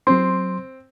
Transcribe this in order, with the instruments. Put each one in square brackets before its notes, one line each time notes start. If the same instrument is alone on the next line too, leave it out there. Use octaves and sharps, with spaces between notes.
[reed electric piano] F#3 C6 [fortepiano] C4